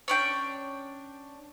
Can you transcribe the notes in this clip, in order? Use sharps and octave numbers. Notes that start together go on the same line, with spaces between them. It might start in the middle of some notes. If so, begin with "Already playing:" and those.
C#4 D4 G5